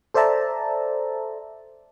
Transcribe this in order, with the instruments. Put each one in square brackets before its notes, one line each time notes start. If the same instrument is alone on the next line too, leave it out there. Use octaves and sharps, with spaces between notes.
[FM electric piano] A4 C5 D5 E5 A5 A#5